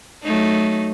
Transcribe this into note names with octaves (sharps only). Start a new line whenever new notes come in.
F#3 A3 D#4